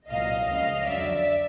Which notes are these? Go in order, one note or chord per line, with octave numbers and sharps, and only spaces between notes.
C2 A#2 F#3 D#5 F5
C#2 C#3 F3 D#5 F5
F2 D3 F#3 D5 E5